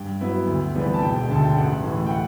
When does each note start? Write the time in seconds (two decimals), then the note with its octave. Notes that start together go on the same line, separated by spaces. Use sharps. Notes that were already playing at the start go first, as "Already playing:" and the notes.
Already playing: G2 G5
0.20 F#3 B3 E4
0.47 D2
0.74 C3 E3 G3 B3
0.94 A5
1.02 E1 G5
1.29 D2 D3 A5
1.44 G5
1.57 A1 F#5
1.84 A2 E3
2.06 G5
2.10 F#5